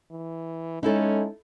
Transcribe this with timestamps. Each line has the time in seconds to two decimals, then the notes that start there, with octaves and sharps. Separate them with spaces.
0.11 E3
0.83 G#3 C#4 D#4 E4 A4